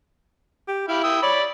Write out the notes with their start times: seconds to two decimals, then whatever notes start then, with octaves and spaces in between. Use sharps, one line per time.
0.68 G4
0.88 E4 G4 F5 B5
1.04 G5 D#6 E6
1.22 C#5 D5 B5